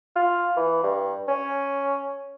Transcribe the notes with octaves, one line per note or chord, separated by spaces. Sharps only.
F4
E3
G2
C#4